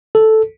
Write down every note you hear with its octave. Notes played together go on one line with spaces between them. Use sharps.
A4